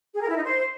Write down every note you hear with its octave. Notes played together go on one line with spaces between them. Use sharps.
G#4
A#4
E4
D#4
C5